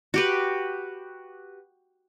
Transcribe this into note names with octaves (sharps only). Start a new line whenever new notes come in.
F#4 G4 B4